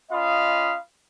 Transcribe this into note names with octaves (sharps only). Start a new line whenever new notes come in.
C#4 F4 D#5 F5 B5 D#6